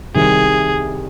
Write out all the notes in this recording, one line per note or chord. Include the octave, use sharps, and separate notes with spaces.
C2 C3 D#3 G3 G#4